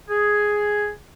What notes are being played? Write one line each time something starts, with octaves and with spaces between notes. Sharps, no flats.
G#4